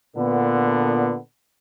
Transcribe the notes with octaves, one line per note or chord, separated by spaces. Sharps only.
A#2 D3 B3